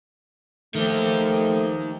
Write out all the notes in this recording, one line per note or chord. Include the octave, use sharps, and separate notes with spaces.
D#3 F3 A3 G4